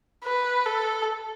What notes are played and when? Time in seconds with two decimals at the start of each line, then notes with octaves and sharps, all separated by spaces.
0.24 B4
0.66 A4